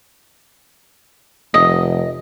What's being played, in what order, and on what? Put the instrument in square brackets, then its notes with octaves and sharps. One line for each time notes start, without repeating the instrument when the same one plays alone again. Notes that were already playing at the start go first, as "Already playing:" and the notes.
[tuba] F1 [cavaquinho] D#5